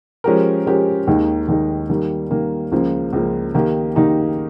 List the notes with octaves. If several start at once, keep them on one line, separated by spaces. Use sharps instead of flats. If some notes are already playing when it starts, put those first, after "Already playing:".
F3 G#3 C#4 G4 A#4
F3 G#3 C#4 G4 A#4
D#2 D#3 G#3 D#4
D#2 D#3 G#3 D#4
D#3 G3 A#3
D#3 G3 A#3
C#2 C#3 F3 A#3
C#2 C#3 F3 A#3
D#3 A#3 D#4 G4
D#3 A#3 D#4 G4